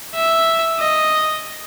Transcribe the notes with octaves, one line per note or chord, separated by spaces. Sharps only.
E5
D#5